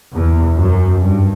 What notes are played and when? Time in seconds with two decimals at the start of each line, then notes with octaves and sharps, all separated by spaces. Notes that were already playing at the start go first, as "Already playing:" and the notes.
0.14 E2
0.57 F#2
1.01 G2